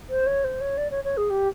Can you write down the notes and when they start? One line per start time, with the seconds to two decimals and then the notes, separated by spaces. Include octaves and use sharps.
0.10 C5
0.26 C#5
0.44 C5
0.61 C#5
0.77 D5
0.91 C#5
1.04 C#5
1.17 G#4
1.30 G4